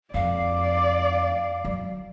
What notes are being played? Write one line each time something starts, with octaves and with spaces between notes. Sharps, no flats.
F2 D5 F5
F#3